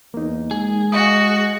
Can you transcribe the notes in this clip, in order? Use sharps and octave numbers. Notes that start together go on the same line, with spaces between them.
E2 A#3 D#4
G#3 G#4
F#4 D#5 F5 D#6